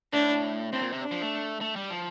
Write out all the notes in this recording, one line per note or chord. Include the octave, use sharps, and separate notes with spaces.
A2 D4
A2 C4
A#2
C3
D4
F3
A3
A3
G3
F3